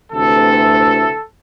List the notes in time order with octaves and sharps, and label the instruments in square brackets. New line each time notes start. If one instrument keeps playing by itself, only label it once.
[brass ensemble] D2 C3 E3 A4